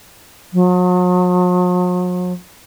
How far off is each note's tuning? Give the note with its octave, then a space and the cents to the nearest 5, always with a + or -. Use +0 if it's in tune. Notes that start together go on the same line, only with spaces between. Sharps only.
F#3 -45